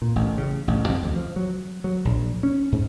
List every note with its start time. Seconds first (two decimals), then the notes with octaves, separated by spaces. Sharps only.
0.02 A#2
0.16 A1
0.37 C#3
0.68 A1
0.89 F2
1.03 D2
1.16 F3
1.36 F#3
1.84 F#3
2.05 A#1
2.43 C#4
2.72 G#2